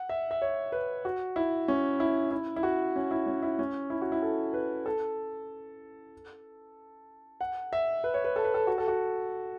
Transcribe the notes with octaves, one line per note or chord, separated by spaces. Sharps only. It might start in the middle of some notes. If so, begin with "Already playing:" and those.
Already playing: F#5
E5
E5
C#5
B4
F#4
E4
C#4
E4
E4
E4
F#4
C#4
E4
C#4
E4
C#4
E4
F#4
E4
A4
B4
A4
F#5
E5
B4
C#5
B4
A4
B4
A4
F#4
A4
F#4